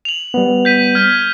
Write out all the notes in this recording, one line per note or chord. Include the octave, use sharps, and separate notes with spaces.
F7 F#7
G3 B3
G6 B6 D#7
F6 G#6 D#7